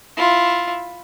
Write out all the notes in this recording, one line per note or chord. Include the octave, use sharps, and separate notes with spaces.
E4 F4